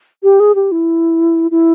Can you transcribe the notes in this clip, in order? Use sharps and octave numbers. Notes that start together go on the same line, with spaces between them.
G4
G#4
G4
E4
E4